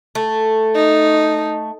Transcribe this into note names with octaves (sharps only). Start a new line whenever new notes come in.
A3
D#4